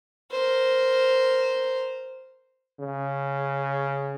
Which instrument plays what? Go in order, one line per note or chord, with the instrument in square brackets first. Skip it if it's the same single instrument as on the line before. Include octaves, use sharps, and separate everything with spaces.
[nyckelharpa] A#4 C5
[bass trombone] C#3